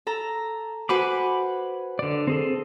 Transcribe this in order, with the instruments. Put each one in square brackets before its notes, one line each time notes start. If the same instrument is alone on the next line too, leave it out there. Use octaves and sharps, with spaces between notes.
[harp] A4 A#5
[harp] F#4 B4 C5 [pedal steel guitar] G#5 B5 D6
[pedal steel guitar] D3 D5
C4 G#4 A4